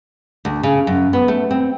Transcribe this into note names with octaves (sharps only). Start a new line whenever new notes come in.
D2
C#3
F#2
B3
A3
C4